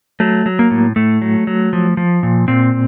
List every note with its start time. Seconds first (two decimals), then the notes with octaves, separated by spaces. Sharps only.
0.20 F#3 A3
0.46 F#3
0.59 A#3
0.71 A2
0.96 A2 A3
1.22 F#3
1.47 F#3
1.73 F3
1.97 F3
2.23 A#2
2.48 A#2 C4